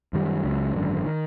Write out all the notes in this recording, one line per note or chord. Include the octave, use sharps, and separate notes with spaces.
F#2 D#3 G3
C#2 C#3 F#3
G#1 F#2 D3
D#3